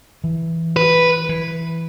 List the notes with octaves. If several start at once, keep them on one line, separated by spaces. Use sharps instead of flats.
E3
B4
E3